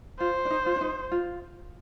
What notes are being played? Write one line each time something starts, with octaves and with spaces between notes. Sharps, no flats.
F4 C5
D4
D#4
F4
D4
D#4
F4